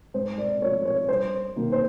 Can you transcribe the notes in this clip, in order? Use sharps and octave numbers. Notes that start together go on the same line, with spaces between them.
G#2 C5
D5
F3 A3 C#5
C#5
G2 C5
D#3 F#3 A#3
C5